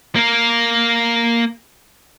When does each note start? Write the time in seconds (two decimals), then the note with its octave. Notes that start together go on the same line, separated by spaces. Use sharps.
0.16 A#3 A#4